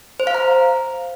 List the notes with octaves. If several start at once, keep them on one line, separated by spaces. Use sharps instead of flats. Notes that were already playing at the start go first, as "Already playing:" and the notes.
C5
F5
A#5